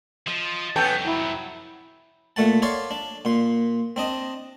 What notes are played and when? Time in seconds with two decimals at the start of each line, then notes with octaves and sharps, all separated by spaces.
0.27 F3 D#5
0.76 C2 F2 B3 C#4 A4 G5
1.05 F#3 E4
2.36 A#2 A3 F#5 A5
2.62 C#5 D5 E5 F5 A5 C6
2.91 D4
3.25 A#2 C6
3.96 C4 D4 D#5